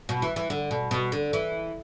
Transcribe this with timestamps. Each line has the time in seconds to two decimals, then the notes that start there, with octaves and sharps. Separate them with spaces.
0.09 B2
0.22 E3
0.36 E3
0.50 D3
0.71 B2
0.91 B2
1.12 D3
1.33 E3